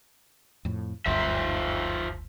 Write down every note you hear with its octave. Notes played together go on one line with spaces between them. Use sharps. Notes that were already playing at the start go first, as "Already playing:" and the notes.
F2 A2
F#1 D2 G2 F4 C5 E5